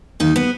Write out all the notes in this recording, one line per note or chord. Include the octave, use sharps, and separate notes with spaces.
D#2 D#4
B3